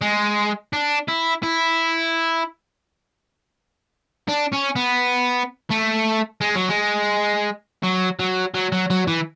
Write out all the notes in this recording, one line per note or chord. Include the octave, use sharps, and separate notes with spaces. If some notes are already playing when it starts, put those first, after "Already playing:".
G#3
D4
E4
E4
D4
C#4
B3
A3
G#3
F#3
G#3
F#3
F#3
F#3
F#3
F#3
E3